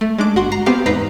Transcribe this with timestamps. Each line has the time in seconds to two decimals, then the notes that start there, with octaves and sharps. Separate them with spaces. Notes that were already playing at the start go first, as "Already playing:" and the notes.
0.01 A3
0.18 G#3 D4 D6
0.36 G1 F#4 F#5 C6
0.52 A#5 A#6 C7
0.66 B3 C4 G4 F5
0.86 E2 G#2 D#4 B4 A#5 C7